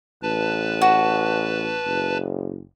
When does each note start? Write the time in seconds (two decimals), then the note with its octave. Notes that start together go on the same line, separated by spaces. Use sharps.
0.22 A1 B4 A5
0.82 F#4
1.86 F#1